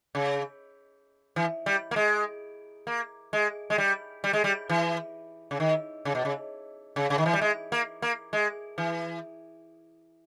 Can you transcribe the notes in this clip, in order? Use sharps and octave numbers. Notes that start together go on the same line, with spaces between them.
C#3
E3
G3
A#3
G#3
A#3
G#3
G#3
G3
G3
G#3
G3
E3
C#3
D#3
C#3
B2
C#3
C#3
C#3
D#3
E3
G3
G#3
A#3
A#3
G#3
E3